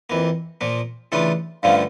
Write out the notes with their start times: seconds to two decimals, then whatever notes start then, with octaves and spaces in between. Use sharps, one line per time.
0.10 F2 E3 A#3
0.61 A#2 F3 A#3
1.12 C#3 E3 A3 D4 F4
1.63 G2 D3 F3 A3 C#4 F5